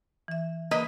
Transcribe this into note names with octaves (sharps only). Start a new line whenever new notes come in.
E3 E5
A#3 B4 D#5